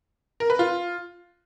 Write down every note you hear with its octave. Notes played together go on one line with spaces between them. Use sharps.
A#4
B4
F4